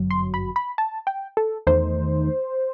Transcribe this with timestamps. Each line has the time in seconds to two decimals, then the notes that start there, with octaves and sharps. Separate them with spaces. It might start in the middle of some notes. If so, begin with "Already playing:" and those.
Already playing: G1 F#2 F#3
0.10 C6
0.34 B5
0.56 B5
0.78 A5
1.07 G5
1.37 A4
1.67 E2 D#3 A3 D#4 C5